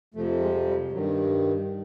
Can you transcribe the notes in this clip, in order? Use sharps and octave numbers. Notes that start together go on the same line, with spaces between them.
F2 C3 F3 A3
G#3
G3
G2 D#3 F#3